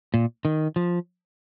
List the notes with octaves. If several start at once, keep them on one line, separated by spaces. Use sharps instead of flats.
A#2
D#3
F3